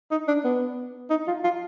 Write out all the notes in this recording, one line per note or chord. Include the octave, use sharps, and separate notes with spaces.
D#4
D4
B3
D#4
F4
F4